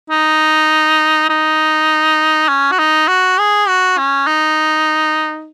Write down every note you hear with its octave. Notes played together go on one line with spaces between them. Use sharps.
D#4
D#4
C#4
F#4
D#4
F#4
G#4
F#4
C#4
D#4